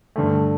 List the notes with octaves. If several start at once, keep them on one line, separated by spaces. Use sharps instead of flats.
G2 D3 A3